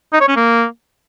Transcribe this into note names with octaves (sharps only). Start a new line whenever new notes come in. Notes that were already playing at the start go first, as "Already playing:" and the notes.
D#4
C#5
C#4
A#3